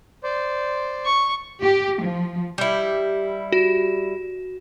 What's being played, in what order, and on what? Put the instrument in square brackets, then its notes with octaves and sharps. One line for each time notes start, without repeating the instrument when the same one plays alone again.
[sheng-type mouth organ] C5 D5
[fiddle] C#6
[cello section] G4
F3
[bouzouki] G3 E4
[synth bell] F#4